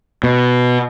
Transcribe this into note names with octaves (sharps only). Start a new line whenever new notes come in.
B2